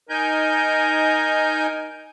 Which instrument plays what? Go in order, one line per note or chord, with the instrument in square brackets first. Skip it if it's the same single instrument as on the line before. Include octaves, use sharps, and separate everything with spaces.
[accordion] D#4 G#5 G6 [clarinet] A#4